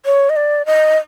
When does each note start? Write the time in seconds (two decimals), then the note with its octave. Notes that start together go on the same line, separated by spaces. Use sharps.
0.06 C#5
0.30 D#5
0.36 D5
0.66 D#5